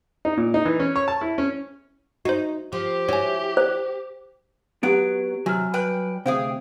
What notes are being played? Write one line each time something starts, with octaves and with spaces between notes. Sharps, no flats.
D#4
A#2
D#4
E3
C#4
C#5
A5
E4
C#4
D#4 F#4 C5
F3 G4
E4 F#4 C#5 G#5
C5
F#3 B3 G4 B4 F#5 D7
C3 F#3 G#5 F6
G3 B4 G5
D2 C3 G#4 C5 F5 G5